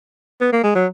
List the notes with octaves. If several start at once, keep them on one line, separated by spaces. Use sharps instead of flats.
B3
A#3
G#3
F#3